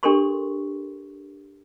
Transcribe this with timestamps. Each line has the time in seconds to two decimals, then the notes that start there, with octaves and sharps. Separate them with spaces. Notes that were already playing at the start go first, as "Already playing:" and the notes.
0.03 D4 G4 A4 A#4 C6 C#6